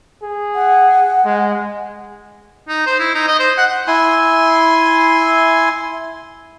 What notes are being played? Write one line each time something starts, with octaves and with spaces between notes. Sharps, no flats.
G#4
F#5
G#3
D#4
C5
E4
D#4
D#5
C5
F#5
E4 G#5 C6